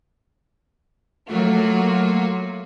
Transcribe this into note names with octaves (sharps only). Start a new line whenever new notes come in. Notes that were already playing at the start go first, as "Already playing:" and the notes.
F#3 A3 A#3 F4 F#4